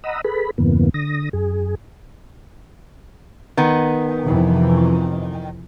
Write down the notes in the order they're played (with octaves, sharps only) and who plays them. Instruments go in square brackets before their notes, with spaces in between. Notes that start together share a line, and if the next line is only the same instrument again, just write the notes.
[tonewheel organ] D#5 F#5 A#5 B5 D#6 E6
G#4 A4 B4 B5
E2 G2 C#3 E3 A#3 B3
D3 D#6 A#6
F#2 G#4
[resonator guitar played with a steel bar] D#3 B3
[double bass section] F2 C3 E3